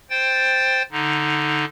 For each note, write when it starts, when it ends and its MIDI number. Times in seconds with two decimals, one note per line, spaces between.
0.10 0.82 72
0.10 0.82 79
0.10 0.82 93
0.92 1.65 50
0.92 1.65 63